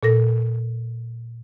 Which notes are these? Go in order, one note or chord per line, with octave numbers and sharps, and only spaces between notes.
A#2 A4 A#6